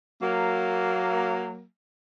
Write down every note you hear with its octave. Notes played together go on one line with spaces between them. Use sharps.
F#3 A#3